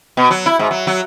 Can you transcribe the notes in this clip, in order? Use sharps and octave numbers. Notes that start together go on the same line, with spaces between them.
B2
F#3
E4
G#2
F#3
F#3